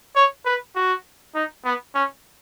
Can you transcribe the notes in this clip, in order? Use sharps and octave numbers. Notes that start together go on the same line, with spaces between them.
C#5
B4
F#4
D#4
B3
C#4